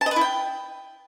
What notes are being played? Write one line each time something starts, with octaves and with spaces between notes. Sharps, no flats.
A5
D#5
B4
E4
G5